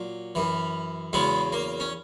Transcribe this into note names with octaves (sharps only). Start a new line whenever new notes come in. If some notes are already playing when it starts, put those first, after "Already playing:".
Already playing: A#2 F#3
F#2 E3
E2 C#3 F#3 G#3 B3
A#3
C#4